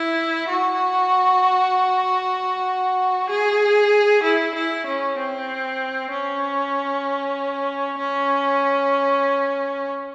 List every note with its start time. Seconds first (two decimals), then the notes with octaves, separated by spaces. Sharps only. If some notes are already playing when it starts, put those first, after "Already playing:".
Already playing: E4
0.48 F#4
3.30 G#4
4.23 E4
4.55 E4
4.86 C#4
5.18 C4
6.11 C#4
7.98 C#4